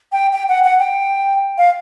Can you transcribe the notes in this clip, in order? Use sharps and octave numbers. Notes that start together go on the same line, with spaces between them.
G5
G5
F#5
F#5
G5
F5